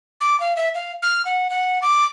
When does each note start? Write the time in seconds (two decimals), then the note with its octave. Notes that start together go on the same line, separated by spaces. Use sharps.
0.21 D6
0.40 F5
0.56 E5
0.74 F5
1.02 F6
1.25 F#5
1.50 F#5
1.82 D6